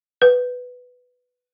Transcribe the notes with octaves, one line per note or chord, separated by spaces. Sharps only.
B4